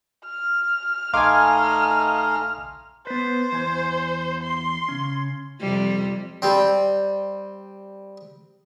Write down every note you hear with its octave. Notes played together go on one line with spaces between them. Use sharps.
F6
A#1 A3 D#4 D#5 F5 G#5 C6 D6
B3 B4 C5
E2 G#5
C6
C#3 C#4
F2 C3 G3
G3 C4